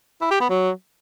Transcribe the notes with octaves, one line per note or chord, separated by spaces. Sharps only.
E4
G4
B3
F#3